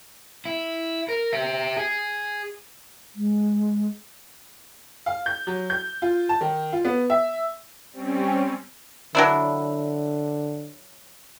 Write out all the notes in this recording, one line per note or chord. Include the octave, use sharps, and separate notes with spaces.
E4
A#4
G4 E5
G#4
G#3
F5
G6
F#3
G6
F4
A5
D#3
F4
B3
E5
G3 C4 C#4
D3 F#3 D4 E4